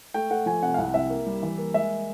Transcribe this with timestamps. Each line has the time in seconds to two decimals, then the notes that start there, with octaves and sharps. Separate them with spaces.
0.14 A3 G5
0.31 A3 F#5
0.46 F3 G#5
0.62 C3 F#5
0.74 F5
0.78 C2 F#5
0.94 C2 E5
1.10 A#3
1.26 G3
1.43 E3
1.58 A#3
1.74 G#3 E5